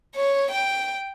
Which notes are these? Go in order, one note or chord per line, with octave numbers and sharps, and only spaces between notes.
C#5
G5